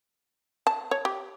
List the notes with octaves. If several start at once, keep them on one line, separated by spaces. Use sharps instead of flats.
A5
C#5
G4